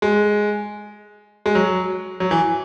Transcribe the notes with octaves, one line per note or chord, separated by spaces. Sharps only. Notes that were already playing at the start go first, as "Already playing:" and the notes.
G#3
G#3
F#3
F#3
E3